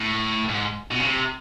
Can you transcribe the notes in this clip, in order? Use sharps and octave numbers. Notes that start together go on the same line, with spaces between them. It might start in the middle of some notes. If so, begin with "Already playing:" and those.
Already playing: A2
G#2
B2
C#3
C3